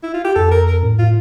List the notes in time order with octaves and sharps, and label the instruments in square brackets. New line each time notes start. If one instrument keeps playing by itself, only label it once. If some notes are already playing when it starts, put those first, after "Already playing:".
[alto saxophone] E4
F4
G4
[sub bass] F2 [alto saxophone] A4
[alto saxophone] A#4
A#4
[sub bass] A2
[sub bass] A2 [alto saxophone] F4